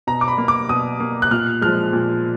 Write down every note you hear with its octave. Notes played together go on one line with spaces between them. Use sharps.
B2 A#5
D6
B5
A#3
D6
B2 D#6
A#3
F#6
A#2 F6
F3 G#3 F6
A#2